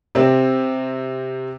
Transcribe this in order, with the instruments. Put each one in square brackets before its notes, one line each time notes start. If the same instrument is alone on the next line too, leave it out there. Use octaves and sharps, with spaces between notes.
[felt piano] C3 C4